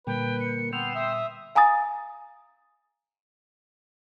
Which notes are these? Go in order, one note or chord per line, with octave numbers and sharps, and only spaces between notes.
A#2 D3 G3 A#3 B4 G5
C#7
B3 G5 C6 E6 F7
E5 D#6
F5 G#5 A#5 D#6 A6